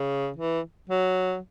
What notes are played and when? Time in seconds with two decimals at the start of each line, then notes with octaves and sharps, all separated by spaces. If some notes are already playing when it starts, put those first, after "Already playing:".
Already playing: C#3
0.36 E3
0.89 F#3